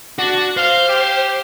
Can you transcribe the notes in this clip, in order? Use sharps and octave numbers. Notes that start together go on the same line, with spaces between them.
D4 F#4
C5 F5
G4